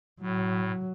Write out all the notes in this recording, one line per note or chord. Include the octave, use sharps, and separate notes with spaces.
A2 F#3